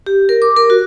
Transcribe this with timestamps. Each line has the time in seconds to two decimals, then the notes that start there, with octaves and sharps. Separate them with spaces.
0.06 G4
0.29 A#4
0.42 D6
0.56 A#4
0.70 F#4